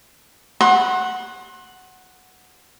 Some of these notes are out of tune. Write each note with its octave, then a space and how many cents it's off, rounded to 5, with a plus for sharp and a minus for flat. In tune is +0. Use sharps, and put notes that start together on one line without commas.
F#5 +0 C6 +35